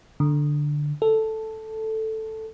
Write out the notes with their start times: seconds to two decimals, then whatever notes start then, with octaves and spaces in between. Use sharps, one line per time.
0.20 D3
1.02 A4